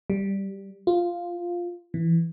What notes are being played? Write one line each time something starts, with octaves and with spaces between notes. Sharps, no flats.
G3
F4
E3